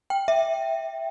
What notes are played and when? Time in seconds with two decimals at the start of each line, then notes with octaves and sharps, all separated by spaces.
0.10 G5
0.28 E5